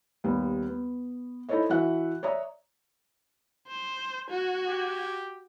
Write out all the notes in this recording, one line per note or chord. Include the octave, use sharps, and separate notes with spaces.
D#2 G3 B3
B3
D#4 E4 A4 C5 C#5 D#5
E3 F#4 E5 F#5 F#6
C#5 D5 E5 A#5 D#6
C5
F#4 G#6
G4